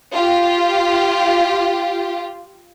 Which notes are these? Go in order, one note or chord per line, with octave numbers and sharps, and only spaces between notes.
F4 G4